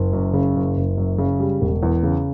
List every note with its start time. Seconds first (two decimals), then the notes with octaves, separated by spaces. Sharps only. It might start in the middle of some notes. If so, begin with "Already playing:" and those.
Already playing: F#1
0.13 F#2
0.33 C#3
0.55 F#1
0.77 F#1
0.98 F#2
1.18 C#3
1.40 G3
1.61 E1
1.83 E2
2.03 C#3